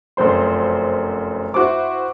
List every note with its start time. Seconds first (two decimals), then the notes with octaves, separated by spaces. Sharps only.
0.17 F1 F#2 C5 C6
1.54 E4 F#4 C5 D6